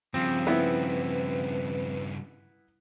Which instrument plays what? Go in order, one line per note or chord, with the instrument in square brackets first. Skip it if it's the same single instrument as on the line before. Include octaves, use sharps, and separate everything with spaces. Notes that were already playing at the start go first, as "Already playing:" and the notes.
[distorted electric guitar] G2 C#3 [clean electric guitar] F3 C4
[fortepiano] B3 E4 [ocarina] B4